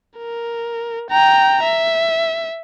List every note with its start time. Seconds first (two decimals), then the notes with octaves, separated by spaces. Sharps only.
0.18 A#4
1.10 G5 A#5
1.63 E5